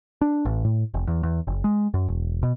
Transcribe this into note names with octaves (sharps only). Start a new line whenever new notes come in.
D4
A1
A2
F1
E2
E2
F#1
G#3
F#2
E1
B2